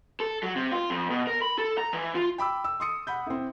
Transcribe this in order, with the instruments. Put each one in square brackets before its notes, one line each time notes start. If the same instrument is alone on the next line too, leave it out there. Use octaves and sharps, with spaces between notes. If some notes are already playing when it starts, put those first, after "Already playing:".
[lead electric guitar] A4
F#3
C3
F4
F2
B2
A#4
B5
A4
A#5
E3
F4
[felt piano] G5 B5 D6 E6
E6
C6 D#6 C#7
F#5 B5 G6
C4 E4